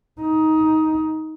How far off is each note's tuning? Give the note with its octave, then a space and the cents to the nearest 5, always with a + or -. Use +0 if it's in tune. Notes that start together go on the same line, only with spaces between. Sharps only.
D#4 +15